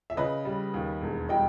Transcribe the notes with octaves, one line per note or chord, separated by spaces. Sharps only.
E5
C#3 B4 D#5
G3
D#2
E1
G3 D#5 G5